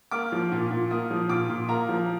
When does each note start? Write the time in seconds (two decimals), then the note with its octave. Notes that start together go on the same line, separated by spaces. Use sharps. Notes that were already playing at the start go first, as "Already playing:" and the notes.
0.11 A#3 D6
0.32 F3
0.52 A#2
0.70 A#2
0.91 A#3 D#6
1.10 F3
1.29 A#2 D6
1.49 A#2
1.68 A#3 A#5
1.89 F3